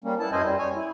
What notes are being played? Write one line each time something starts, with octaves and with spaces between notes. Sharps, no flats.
G3 A#3 C#4
B3 E4 A5
F#2 C#4 E4 C5 D#5 G#5
G3
C#5 G#5
E4